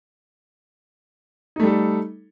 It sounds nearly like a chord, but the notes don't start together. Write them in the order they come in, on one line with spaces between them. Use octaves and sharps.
D#4 A3 G3 A4